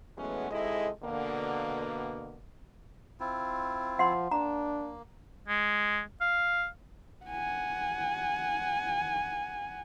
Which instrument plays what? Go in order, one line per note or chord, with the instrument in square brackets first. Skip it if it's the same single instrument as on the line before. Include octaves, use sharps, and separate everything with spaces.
[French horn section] E3 F#3 G#3 A3 B3 C#4
G#2 C3 G#3 E4 A4 D#5
B2 D3 A#3
[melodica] C4 E4 F4
[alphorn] F3 [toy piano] F#5 C6
[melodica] A#3 [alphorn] D4 [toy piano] A#5
[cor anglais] G#3
F5
[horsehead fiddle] F#5 G#5